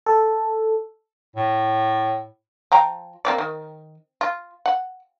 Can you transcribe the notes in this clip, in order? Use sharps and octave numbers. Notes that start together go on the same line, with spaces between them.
A4
A2
F3 G5 A#5
A#3 C4 D5
D#3
F4
F#5